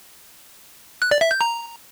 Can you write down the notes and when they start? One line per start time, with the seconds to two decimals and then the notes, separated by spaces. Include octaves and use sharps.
1.02 F#6
1.11 D5
1.21 E5
1.31 G6
1.41 A#5